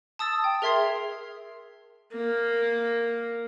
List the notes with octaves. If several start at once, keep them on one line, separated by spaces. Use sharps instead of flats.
A5 D#6 E6 A6
G5
G#4 A#4 E5 C6 G#6 C7
A#3